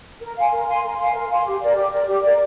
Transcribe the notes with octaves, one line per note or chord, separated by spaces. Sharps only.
A#4
F5 G#5 C6
A#4
F5 G#5 C6
A#4
F5 G#5 C6
A#4
F5 G#5 C6
G4
A#4 D5
G4
A#4 D5
G4
A#4 D5